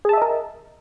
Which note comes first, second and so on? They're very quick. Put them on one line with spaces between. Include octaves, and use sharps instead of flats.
G#4 A5 E5 D#5 A#4